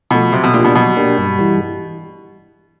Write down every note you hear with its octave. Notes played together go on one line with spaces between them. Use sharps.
B2 F3 A3
C3 F#3
B2
A#2 A#3 D4 G4
B2
B2 F#3
A#3 D4 G4
G2
E3 G3